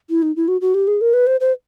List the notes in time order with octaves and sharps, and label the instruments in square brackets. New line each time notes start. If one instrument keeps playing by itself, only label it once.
[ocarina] E4
D#4
E4
F#4
F#4
G4
G#4
A#4
B4
C5
C5